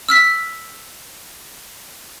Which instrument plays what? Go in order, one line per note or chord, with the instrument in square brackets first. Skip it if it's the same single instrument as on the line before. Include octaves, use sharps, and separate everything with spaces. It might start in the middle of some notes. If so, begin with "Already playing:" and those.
[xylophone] E6 F6 B6